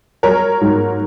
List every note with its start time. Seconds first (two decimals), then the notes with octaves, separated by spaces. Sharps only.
0.23 F#3 A#4 C#5
0.61 G#2